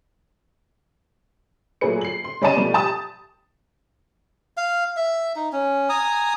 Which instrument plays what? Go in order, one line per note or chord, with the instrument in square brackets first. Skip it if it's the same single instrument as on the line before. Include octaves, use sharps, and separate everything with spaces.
[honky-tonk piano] A#2 F#3 A3 G#4 B4 C#7
C7 F#7
C6
G3 C#4 D5 D#5 A5 D#7
B2 F3 G3 A3
G4 A5 D#6
[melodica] F5
E5
D#4
C#4
G#5 A#5 D#6